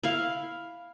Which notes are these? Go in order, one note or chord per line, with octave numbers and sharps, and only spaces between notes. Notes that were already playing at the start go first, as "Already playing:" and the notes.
E4 F5